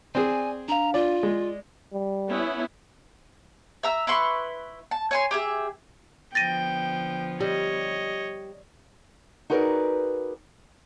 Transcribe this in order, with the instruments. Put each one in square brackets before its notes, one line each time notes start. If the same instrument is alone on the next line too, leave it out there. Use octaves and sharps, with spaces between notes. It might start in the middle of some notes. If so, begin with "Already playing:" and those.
[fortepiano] C4 G#4 [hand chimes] D5 [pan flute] G#5
[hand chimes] D4 F5 [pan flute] A#5
[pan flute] F4 [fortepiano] D5
[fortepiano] G#3 [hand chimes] D5
[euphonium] G3
[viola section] B3 C#4 E4
[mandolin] E5 A#5 E6
E4 B4 C6 C#6
A5
C#5 G#5 C6
G4 G#4 E5
[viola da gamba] D3 F3 B3 [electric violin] G5 [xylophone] A6 A#6 D#7
[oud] G3 [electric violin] C#5 D#5
[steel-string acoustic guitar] D#4 F#4 G#4 A#4 B4 D5